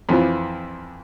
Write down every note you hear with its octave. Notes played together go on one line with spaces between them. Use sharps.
F2 E3 F3